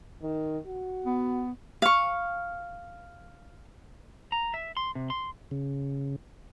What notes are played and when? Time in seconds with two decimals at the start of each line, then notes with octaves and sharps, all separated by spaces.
0.22 D#3
0.66 F#4
1.05 B3
1.82 F5 C#6
4.32 A#5
4.54 E5
4.77 C6
4.95 C3
5.10 C6
5.51 C#3